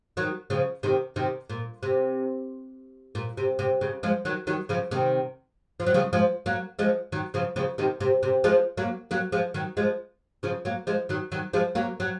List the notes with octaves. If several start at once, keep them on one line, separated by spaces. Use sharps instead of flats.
D#3 F#3
C#3 F3
C3 D#3
C3 D#3
A#2
C3
A#2
C3
C3
C#3
F3 G#3
D#3 F#3
D#3 F#3
C#3 F3
C3 D#3
F3
F#3
C#3 F3
F3 G#3
F#3 A#3
F3 G#3
D#3 F#3
C#3 F3
C#3 F3
C3 D#3
C3
C3
F3 G#3
F#3 A#3
F#3 A#3
F3 G#3
D#3 F#3
F3 G#3
C#3 F3
F#3 A#3
F3 G#3
D#3 F#3
D#3 F#3
F3 G#3
F#3 A#3
F#3